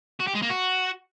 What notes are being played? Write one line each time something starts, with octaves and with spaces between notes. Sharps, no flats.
F#4
G4
G#3
A#3
F#4